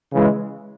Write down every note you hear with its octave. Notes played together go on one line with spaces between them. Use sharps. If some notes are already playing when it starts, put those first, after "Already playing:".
C#3 E3 G#3